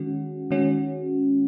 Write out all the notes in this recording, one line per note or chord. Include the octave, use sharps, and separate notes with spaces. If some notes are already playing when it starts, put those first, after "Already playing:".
Already playing: D#3 G#3 C#4 F#4
D#3 G#3 C#4 F#4